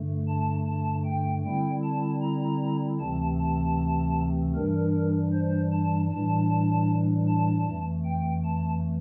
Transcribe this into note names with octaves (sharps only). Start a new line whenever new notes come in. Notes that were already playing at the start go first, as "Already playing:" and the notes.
Already playing: G2 D3 A3
A5
A5
G5
D3 G3 C4 E4 G5
A5
A#5
D2 C3 E3 A3 C4 A5
A5
G2 E3 G3 D4 A#4
C5
A5
A2 E3 G3 D4 A5
A5
F2 E3 A3
G5
A5